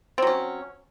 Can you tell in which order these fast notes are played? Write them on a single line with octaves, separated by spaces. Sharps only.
C4 F#3 C#4